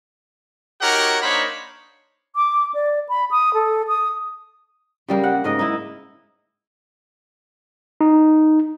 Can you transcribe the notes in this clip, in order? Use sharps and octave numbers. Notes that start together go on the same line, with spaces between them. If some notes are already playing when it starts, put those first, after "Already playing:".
D#4 F#4 G4 A#4 C#5 F#5
A#3 D4 D#4 C5 C#5 B5
D6
D5
B5
D#6
A4
D#6
C#3 G3 A#3
F#5
G#2 C#3 A#4 D#5
D#4 E4
D#4